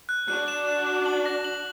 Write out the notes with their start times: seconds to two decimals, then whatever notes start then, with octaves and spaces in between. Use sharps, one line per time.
0.09 F#6
0.28 D4 F#4 F#6
0.48 E7
0.67 E7
0.87 E7
1.06 F#7
1.26 A#6
1.44 F#7